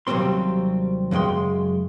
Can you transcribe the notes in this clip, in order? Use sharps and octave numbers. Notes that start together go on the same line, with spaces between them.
D#2 C3 F#3 G3 C4 C6
F#2 C#3 G#3 G5 C6